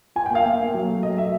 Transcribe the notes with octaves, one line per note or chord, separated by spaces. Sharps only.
F4 G#5
G5
A#3 F5
A#3 E5
A#3
F#3
A3
F#3 D#5
A3 E5